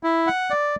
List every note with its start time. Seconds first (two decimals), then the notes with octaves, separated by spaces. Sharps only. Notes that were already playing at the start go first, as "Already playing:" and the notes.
0.03 E4
0.27 F#5
0.50 D5